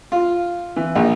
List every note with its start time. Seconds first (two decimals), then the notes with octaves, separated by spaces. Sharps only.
0.12 F4
0.76 E3
0.95 A#1